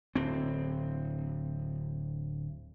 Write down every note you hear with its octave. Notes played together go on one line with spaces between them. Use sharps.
D1 C4